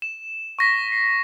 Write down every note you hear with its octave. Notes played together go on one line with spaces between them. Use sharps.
E7
C#6 A#6 B6
C7